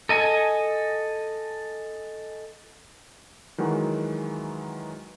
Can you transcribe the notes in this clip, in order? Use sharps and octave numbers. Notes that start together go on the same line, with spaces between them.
A4 D#5 G#5
D#3 E3 F#3 G#3 F#4